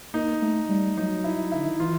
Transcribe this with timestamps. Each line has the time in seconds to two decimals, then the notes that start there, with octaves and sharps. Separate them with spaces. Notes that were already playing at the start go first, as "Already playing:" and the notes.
0.14 A#3 D#4
0.42 A3
0.69 G3
0.97 F#3 D#4
1.24 E4
1.52 D3 E4
1.67 D#3
1.79 E3 F4